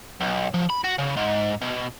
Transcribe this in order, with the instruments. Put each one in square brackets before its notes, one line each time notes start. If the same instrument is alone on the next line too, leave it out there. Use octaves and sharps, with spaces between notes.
[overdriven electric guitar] B1
F3
B5
F#4
C#3
G#2
B2